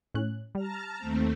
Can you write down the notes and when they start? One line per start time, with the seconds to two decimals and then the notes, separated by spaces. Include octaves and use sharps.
0.14 A2 C#4 F#6
0.55 G3 A5 A#5 F6
0.98 D#2 A3 C4